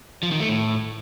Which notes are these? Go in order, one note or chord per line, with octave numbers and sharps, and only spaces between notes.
F3
D#3
A3
A2